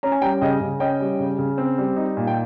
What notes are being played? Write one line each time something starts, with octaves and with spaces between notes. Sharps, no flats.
C#4 A#5
G#5
G3 G5 A#5
C#3 D#5 G5
C#3
C#4 D#5 G5
G3
C#3
C#3
C4
G3
D#4
A#2
G5